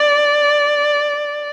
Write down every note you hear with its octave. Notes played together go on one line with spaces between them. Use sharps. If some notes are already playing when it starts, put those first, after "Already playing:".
Already playing: D5